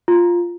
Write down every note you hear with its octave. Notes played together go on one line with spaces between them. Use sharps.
F4